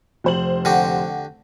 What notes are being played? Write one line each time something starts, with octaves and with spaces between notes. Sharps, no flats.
F1 C5 F#7
D3 F#4 G4